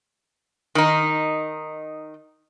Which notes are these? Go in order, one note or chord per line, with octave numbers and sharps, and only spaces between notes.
D#3 D#4